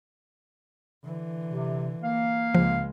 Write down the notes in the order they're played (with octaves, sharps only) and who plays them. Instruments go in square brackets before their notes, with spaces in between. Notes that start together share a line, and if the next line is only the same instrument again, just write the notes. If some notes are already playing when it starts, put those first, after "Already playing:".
[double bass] D3 E3
[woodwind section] C3
A#3 F5
[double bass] C#2 G#3 [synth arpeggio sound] F3